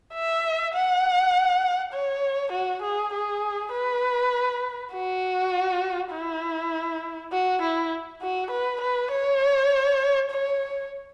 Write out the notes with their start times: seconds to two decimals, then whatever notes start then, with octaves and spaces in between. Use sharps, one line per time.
0.13 E5
0.74 F#5
1.93 C#5
2.52 F#4
2.82 G#4
3.13 G#4
3.72 B4
4.93 F#4
6.12 E4
7.32 F#4
7.62 E4
8.22 F#4
8.51 B4
8.81 B4
9.11 C#5
10.31 C#5